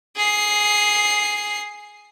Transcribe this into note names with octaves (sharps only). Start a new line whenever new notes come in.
G#4 C7